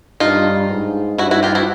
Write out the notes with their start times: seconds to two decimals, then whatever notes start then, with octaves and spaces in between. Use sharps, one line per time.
0.20 G2 D#4 F4
0.70 G#2
1.18 G2 E4 F#4
1.31 E4 F#4
1.43 F4 G4
1.55 E4 F#4